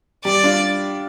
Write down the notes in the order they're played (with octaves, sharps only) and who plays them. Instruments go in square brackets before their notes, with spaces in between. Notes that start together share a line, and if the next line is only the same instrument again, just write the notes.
[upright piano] G3 [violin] D5
[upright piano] D4 F4